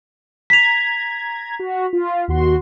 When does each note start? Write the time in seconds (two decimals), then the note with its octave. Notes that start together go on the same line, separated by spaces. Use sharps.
0.50 A#5 G#6 B6 F7
1.59 F#4
1.93 F4
2.28 D#2 F#4 C6